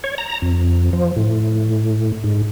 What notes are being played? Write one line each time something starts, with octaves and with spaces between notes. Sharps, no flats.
C#5
A#5
F2
F3
A2
G#2